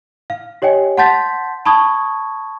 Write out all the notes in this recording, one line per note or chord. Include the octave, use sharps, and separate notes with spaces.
F5
G4 C#5 D#5 G5 G#5
F#5 A5 C6 G6 A6 B6
A5 B5 C#6 D#6 G#6